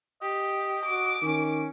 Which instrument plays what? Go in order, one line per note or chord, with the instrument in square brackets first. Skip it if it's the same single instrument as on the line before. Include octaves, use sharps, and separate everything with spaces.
[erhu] G4 [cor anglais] D#5
[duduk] F#4 [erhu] D6
[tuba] D#3 [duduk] C#4